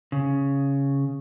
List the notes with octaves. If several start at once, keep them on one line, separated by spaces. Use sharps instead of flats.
C#3